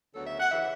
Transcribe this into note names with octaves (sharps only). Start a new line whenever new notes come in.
D2 C#3 F#3 B3 A4
E5
F#5
C#3 E3 E5